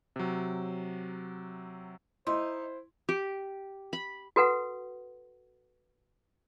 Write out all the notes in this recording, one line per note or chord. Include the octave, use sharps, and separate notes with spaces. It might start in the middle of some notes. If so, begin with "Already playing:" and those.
C3 F#3
D#4 E4 C5 C6
G4
B5
F#4 A4 B4 F#5